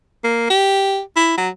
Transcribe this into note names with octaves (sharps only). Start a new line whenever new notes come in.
A#3
G4
E4
F#3